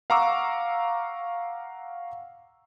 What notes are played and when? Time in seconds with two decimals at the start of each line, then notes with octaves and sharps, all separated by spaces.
0.10 F5 F#5 A#5 C#6 D6 E6